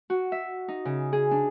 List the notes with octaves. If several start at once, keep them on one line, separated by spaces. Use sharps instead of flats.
F#4
E5
D#4
C#3
G#4
D4